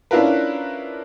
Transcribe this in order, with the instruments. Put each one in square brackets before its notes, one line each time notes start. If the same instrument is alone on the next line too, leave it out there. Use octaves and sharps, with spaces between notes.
[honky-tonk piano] C#4 D4 E4 F4 A#4 B4